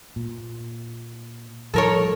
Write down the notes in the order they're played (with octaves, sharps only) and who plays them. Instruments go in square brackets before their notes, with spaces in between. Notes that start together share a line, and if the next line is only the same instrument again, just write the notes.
[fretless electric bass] A#2
[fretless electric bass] A2 F3 G3 [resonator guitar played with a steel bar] A4 A#4 C#5